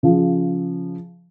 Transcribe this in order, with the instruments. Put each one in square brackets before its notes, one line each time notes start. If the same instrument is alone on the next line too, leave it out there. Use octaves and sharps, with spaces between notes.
[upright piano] C#3 F3